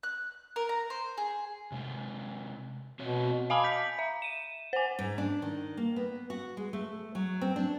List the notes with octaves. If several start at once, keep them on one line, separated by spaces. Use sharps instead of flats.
F#6
A#4
A#5
C5
G#4
C3 G#3
B2 C4 F#4 C#5
D#5 F5 G#5 A5 B5 D6
G6 B6
E5
D#7 E7
C5 G#5
G#2
D4
D#3
A#3
B3
F#4
G#3
A3
F#3
C4
D4